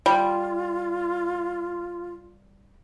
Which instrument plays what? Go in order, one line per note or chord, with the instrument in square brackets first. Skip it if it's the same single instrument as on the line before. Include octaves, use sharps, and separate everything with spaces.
[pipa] G3 [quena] F4